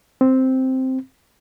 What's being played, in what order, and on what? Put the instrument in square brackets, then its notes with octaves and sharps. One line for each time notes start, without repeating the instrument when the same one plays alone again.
[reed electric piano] C4